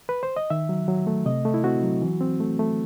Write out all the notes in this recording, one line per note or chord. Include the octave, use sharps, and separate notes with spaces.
B4
C5
D#5
D#3 E5
F#3
F#3
A3
C3 D#5
A3
E4
C4 F#4
F#3
E3
C4
A3
A3